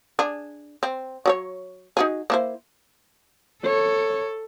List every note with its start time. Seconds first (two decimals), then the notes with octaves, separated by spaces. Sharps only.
0.19 D4 G#4
0.83 C4
1.26 F#3 F#4 C#5
1.97 D#4 F#4 G#4
2.30 A#3 E4 C5
3.63 A4 C#5